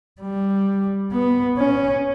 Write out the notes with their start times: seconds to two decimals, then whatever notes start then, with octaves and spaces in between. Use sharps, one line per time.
0.21 G3
1.12 B3
1.58 C#4